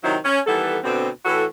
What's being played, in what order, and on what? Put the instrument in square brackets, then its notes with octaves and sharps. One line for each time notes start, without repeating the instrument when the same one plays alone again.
[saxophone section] C3 D#3 F#3 D#4 E4 C5
C#4
D#3 E3 G3 B3 A4
D2 B2 D3 C4
A2 E3 F#4 A4